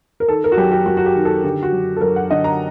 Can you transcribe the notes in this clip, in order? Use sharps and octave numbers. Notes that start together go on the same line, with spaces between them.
A#4
D#3 A4
A#4
F#4
F#2 G4
G4
F#2 F#4
F#4
G4
D#3
A4
D3 G4
F#4
F#2
A4
F#2 A#4
F#5
D3 D#5
A#5